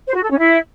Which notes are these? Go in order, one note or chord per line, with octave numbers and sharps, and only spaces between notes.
C5
F#4
A4
C#4
E4